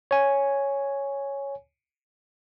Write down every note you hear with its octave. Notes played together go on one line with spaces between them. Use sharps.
C#5 G#5